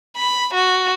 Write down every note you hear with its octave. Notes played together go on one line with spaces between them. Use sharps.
B5
F#4